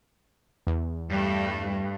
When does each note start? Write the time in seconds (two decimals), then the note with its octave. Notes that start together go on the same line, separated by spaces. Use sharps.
0.67 E2
1.10 G2 G3 A3